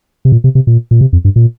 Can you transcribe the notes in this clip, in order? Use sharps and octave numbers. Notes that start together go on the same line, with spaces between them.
C3
A#2
C3
C3
A#2
A#2
C3
F2
G2
A#2